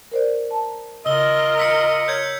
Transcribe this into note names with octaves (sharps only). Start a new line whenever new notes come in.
A#4 C5 D5
A5 A#5
C#3 F4 A#4 D#5 E6 G7
E6 B6 C#7
C#5 G6 G#6 C#7